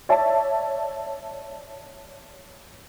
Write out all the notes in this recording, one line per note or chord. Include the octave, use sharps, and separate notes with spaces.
C#5 D5 E5 A5